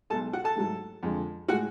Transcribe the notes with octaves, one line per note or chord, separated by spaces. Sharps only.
B1 B2 G#3 A4 A5
F#4 F#5
A4 A5
G#2 F#3 A3
F2 D3 G#3
A2 G#3 F#4 F#5